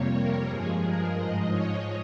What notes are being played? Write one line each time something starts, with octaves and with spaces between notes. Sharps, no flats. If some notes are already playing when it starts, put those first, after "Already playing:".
Already playing: F2 C3 G3 A#3 C#5
A#4
G2 F3 G#3 G#4
A#4
G#2 F3 G#3 D#5
C#5